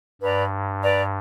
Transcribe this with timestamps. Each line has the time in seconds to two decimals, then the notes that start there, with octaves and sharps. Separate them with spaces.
0.22 G2 B4 D5 A#5
0.81 B4 D5 A#5